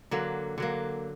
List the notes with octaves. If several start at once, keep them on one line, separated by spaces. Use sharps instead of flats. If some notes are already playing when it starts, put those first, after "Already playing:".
D3 F#3 A#3
D3 F#3 A#3